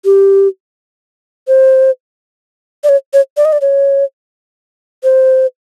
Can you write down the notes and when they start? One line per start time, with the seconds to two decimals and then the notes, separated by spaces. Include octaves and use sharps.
0.05 G4
1.48 C5
2.84 D5
2.89 C#5
3.13 C#5
3.37 D5
3.45 D#5
3.53 D5
3.61 C#5
5.03 C5